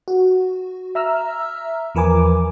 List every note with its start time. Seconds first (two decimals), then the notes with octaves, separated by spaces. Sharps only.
0.08 F#4
0.95 E5 A#5 E6 F6
1.95 E2 F3 A#4 B4 G#5 D6